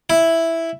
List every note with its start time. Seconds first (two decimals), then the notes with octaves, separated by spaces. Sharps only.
0.10 E4